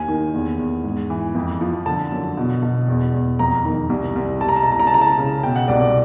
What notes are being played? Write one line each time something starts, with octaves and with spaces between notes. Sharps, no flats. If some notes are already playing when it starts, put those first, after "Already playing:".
Already playing: D#2 G#5
D#3
E2
E2
G#2
E3
F2
F3
D3 A5
F#2
B2
B2
E2
E2
F2 A#5
D#3
C2
C2
C3 A5
A#5
A5
C3 A#5
A5
A#5
A5
C#3 A#5
A5
C#3
B2 G5
F#5
C2 D5
D5